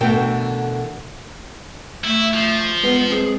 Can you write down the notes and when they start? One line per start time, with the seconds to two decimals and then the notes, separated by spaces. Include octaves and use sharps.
0.01 B2 D3 E3 A3 A#4 G5
2.04 A3 E4
2.33 F3
2.84 G#3 B3 B4
3.10 G#3 C4 G#4